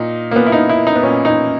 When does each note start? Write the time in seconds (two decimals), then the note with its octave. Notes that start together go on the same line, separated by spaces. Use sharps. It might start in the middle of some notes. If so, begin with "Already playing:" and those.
Already playing: A#2 D#4
0.31 A#3
0.36 A#2 B3
0.46 E4
0.52 D#4
0.69 E4
0.87 D#4
0.95 B3
1.03 A#2 C#4
1.25 D#4